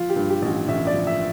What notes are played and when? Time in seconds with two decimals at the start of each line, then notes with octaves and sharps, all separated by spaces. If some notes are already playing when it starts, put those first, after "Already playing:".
Already playing: F3 F4
0.09 G4
0.16 G2
0.30 G4
0.42 A1
0.48 F4
0.68 A1 E5
0.87 D5
0.93 F3
1.07 E5